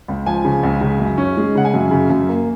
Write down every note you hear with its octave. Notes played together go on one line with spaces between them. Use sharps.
C#2
F3 G#5
C#3
C#2
C#3
F#2
C#4
G#3
C#3 F#5
G#5
F#2
C#3
F#2
A#3